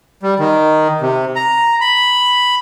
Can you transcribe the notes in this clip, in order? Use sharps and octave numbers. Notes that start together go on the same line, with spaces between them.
G3
D#3
C3
A#5
B5